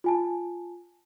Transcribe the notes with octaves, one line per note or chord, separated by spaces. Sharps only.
F4 G#5 A5